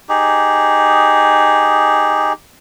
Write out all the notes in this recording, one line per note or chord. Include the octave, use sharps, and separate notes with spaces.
D#4 G4 G#4